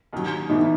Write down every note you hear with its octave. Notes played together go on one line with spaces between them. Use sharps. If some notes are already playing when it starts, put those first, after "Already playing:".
D#2 D#3 F#3
A2 E3 B3 D#4